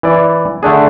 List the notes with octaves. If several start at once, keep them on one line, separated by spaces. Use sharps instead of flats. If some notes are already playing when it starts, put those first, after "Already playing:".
E3 D5
D3 A3 D4 G#4